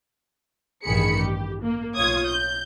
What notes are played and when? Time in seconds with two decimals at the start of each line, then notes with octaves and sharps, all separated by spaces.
0.84 A1 G2 D#3 G#4 B5 C#7
1.17 G4
1.63 A#3
1.95 B1 F4 C#5 D#6 G#6
2.26 G6